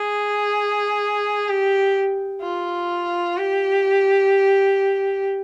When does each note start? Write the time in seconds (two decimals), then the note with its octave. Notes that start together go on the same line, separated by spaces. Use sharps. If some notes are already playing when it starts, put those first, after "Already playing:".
Already playing: G#4
1.49 G4
2.42 F4
3.36 G4